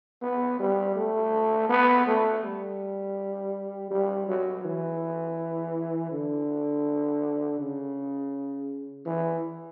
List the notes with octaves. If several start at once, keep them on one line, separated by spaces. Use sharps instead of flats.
B3
G3
A3
B3
A3
G3
G3
F#3
E3
D3
C#3
E3